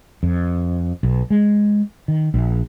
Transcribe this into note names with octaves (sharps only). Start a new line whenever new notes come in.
F2
B1
G#3
D#3
A#1